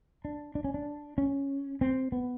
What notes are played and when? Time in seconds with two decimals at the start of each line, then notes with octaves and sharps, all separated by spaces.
0.25 D4
0.55 D4
0.64 C#4
0.74 D4
1.18 C#4
1.81 C4
2.12 B3